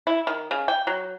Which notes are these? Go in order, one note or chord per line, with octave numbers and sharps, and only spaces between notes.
E4
D#3
C#3
G5
F#3